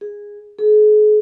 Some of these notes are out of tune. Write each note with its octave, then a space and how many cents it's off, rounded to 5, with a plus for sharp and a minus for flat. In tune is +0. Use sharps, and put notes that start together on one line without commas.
G#4 -10
G#4 +40